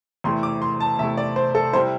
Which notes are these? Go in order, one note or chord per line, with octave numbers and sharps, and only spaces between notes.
E2 C3 A3 E4 C6
D6
C6
A5
E2 C3 A3 E4 E5
D5
C5
A4
C3 G3 E4 C5